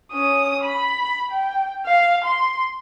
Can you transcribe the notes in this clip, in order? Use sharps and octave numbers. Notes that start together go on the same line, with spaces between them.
C#4 D#6
B5
G5
F5
C6